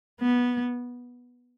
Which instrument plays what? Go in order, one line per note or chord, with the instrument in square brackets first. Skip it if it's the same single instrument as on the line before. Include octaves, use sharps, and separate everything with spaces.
[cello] B3